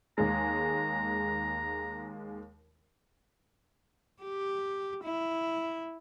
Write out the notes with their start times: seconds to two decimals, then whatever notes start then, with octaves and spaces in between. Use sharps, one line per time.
0.18 D#2 G#3 A#5
4.22 G4
5.04 E4